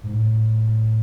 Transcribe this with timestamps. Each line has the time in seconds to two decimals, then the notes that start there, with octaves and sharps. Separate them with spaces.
0.04 G#2
0.13 A2